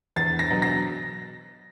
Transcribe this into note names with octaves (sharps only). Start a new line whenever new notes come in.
E2 A6
A#6
B2 F#3
A#6